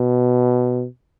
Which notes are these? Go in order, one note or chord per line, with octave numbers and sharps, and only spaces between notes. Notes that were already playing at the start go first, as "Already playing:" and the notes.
Already playing: B2